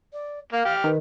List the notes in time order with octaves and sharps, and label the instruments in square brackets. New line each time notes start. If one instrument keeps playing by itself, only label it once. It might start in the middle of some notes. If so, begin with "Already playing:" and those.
[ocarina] D5
[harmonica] A#3 [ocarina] F5
[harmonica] G4 F6
[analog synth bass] D#3 [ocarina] B4